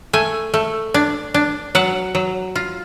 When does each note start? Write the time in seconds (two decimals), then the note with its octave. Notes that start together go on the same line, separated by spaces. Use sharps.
0.13 A3 G#5
0.54 A3
0.94 D4
1.34 D4
1.75 F#3 F#5
2.15 F#3
2.55 F4